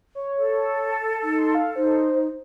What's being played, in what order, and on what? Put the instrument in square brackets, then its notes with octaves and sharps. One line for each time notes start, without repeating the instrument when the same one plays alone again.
[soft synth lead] C#5
[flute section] A4
[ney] D#4
[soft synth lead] C6
F5
[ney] D#4 [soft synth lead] C5